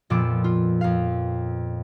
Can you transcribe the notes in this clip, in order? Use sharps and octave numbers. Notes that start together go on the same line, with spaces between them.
F2 A#2 F3 B3 D6 E6
F4
F2 F5